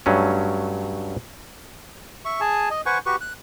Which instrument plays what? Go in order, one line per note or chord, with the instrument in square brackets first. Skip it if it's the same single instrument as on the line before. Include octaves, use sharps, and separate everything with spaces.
[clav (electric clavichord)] G2 F#3 A3 C#4
[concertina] E5 C#6
G#4 G#5 A5
D#5
B4 C5 F#5 G#5 C#6
F#4 G4 B4 C#6
F#6